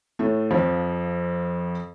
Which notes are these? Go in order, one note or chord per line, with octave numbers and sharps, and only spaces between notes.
A2 A3
F2 F3